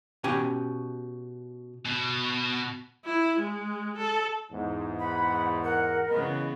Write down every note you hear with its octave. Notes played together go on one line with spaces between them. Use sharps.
B2 C#4 G4 G#5
B2
E4
G#3
A4
E2 G#2
F#5 B5
A#4 F#5
C#3 E3 B3 D#5